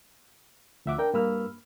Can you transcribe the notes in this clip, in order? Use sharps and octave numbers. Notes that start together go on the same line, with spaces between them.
D2 F3 E5 F#5 D6 E6
D4 A#4 G5
G2 A#3 B5 E6 F6